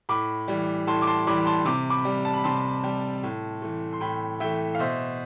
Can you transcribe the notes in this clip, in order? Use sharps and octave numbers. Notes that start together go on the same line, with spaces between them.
A2 B5 D6
E3 G3
A2 A5 C6
D6
A5 C6
E3 G3 B5 D6
A5 C6
C3 D6
B5 D6
G3
A5
B5
C3 A5 C6
G3
A2
E3 A3
C6
A2 G5 B5
E3 A3 E5 G5
F5
B2 C5 E5